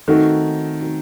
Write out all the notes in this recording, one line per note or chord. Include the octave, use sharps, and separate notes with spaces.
D#3 A3 C4 D#4 F#4
A3 C4 D#4 F#4